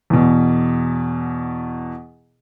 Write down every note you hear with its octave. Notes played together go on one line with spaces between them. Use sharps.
E2 B2